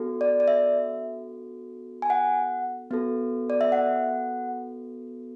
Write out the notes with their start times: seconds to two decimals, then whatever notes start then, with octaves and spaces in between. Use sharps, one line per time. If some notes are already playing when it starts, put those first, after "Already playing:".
Already playing: B3 D4 F#4 A4
0.21 D5
0.40 D5
0.48 E5
2.02 G#5
2.10 F#5
2.91 B3 F#4 A4
3.50 D5
3.61 E5
3.72 F#5